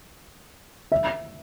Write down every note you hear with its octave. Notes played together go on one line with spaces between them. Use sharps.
E5